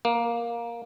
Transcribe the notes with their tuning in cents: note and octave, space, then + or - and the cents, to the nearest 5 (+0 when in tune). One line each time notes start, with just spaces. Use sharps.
A#3 +10